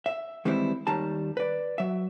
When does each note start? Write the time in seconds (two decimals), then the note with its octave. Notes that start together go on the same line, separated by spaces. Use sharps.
0.06 E5
0.45 D#3 E3 G3 G#3 C4 E4
0.87 D#2 D#3 G3 A5 A#5
1.37 B4 D5
1.78 F#3 E5